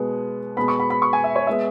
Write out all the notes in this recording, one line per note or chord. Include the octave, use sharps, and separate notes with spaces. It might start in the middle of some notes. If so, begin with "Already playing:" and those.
Already playing: B2 G#3 B3
B2 G#3 B3 B5
C#6
B5
B5
C#6
G#5
E5
C#5
G#3 B3 E5